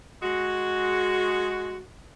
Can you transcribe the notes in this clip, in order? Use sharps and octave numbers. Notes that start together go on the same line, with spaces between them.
G#3 F#4